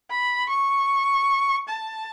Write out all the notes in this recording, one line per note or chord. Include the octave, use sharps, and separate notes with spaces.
B5
C#6
A5